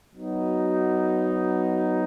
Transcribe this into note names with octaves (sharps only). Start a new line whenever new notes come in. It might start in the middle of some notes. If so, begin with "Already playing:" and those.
F#3 B3 D#4 F#4